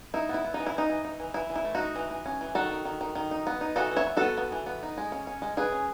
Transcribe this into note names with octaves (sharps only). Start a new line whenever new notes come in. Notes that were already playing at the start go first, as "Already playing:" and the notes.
D#4 E4
B3
E4
B3
D#4
E3
E4
E3 D#4
E3
D#4
E3
E3 E4
E3
E4
A3
D#4 F#4
A3
E3
E3
C#4
E3
D#3 F#4 A4
D#3
D#3
D#3
D#3
D#4
B3
D#4
E3 F#4 A4
E3
C#5 E5
B3
B3 F#4 A4
B3
E3
B3
D#4
G#3
C#4
C#4
G#3
G#3 G#4 B4
C#4